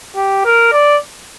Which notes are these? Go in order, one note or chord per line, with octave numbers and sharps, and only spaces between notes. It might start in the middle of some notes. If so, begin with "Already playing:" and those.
G4
A#4
D5